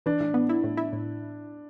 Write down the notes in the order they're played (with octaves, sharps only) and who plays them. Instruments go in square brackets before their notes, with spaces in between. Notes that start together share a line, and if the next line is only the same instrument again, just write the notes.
[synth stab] E3 [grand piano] D4
[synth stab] A2
B3
E4
A2
E4
A2